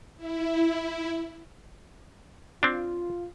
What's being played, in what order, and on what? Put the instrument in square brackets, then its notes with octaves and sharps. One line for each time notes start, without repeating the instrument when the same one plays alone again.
[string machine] E4
[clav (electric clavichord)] C4 D4 [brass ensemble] F4